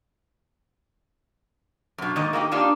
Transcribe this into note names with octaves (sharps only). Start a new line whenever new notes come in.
F#2 B2
G#2 D#3 A#3 D#5
A#3 D#4 F#4 G4
A#3 D4 D#4 F4 G4